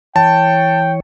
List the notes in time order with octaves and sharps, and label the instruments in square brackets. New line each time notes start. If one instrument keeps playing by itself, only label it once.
[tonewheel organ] E3 C#5 [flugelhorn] G5 [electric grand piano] A5